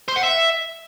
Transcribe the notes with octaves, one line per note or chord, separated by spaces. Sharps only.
C5
F#5
E5